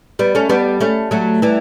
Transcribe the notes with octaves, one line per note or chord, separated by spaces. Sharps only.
G3 B3
A3 C#4
G3 B3
A3 C#4
F#3 A3
E3 G3